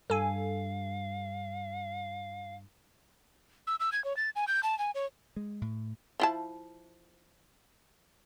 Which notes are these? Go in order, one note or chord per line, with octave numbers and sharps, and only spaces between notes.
G2 A4 F5 G#5
E6
E6
G#6
C#5
A6
G#5
G6
A5
G#5
C#5
G#3
A2
F3 E4 A5